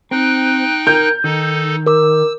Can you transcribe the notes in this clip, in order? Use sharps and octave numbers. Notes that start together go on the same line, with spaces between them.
C4 D#4 G5 F#6
A#4 G6
D#3 D#4 A4
A#4 D6 E6